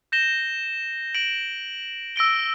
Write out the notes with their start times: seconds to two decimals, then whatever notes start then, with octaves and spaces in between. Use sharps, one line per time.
0.12 G6 A#6 E7 G7
1.14 A#6 D7 F#7
2.16 E6 A#6 D7 G7